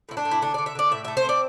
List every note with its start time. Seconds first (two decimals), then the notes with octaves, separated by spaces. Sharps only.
0.09 A2 E4
0.17 D4
0.25 A2
0.31 E4
0.42 D3 D4
0.54 D3 D5
0.66 E5
0.75 D3 D5
0.91 A2 E5
1.05 A3 E5
1.17 C5
1.25 C4 D5